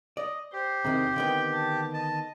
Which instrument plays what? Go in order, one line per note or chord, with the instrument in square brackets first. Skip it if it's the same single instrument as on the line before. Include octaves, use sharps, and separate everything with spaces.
[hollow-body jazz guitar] D5 [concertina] D#5
[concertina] G4 [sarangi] C5
[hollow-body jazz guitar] E2 C3 D#3 [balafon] C4
[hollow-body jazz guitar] D3 D#3 B3 [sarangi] G5
[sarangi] A5
[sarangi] D#5 [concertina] A5